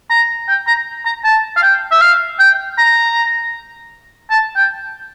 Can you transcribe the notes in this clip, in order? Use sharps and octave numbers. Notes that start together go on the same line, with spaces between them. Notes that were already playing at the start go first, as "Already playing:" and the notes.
A#5
G5
A#5
A#5
A5
F5
G5
E5
F5
G5
A#5
A5
G5